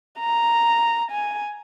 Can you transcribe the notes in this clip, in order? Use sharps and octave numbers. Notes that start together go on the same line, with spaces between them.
A#5
G#5